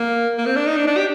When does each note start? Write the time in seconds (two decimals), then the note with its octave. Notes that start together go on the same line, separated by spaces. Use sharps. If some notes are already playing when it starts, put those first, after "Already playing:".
Already playing: A#3
0.38 A#3
0.46 C4
0.56 D4
0.67 D#4
0.77 D4
0.87 D4
0.97 G4